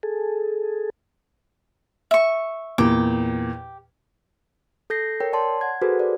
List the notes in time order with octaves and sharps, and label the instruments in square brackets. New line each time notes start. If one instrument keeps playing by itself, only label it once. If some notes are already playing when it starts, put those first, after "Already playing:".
[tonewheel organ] G#4 A4
[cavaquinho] E5 C#6
[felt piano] E2 A#2 [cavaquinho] G4 D6
[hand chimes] A4 G6 A#6 C7
A#4 C#5 G5
C#5 D5 A5 C6
F#5 G#6
F#4 G#4 A4 B4 C5
D5